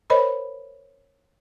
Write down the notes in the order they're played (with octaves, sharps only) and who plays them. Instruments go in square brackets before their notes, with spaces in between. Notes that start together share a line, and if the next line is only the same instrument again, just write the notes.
[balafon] A#4 C5 C#5 D#5 B5